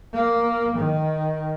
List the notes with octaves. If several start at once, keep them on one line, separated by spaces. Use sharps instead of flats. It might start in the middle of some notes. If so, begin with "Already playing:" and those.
A#3
D#3